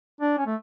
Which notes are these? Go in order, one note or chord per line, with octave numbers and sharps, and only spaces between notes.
D4
C#4
A3